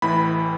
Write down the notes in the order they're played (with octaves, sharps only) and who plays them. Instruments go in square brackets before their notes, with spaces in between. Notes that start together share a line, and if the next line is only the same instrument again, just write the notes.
[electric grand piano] A1 A2 E3 B5